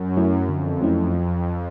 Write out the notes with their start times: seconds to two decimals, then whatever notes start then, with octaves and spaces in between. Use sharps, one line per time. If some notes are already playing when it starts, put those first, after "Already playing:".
Already playing: F#2
0.17 F#3 A3 C#4 E4
0.49 F2 D3
0.81 F#3 A3 C#4 E4